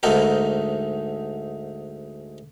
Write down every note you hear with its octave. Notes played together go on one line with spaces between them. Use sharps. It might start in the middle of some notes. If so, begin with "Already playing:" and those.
D2 G#2 A3 D#4 A#4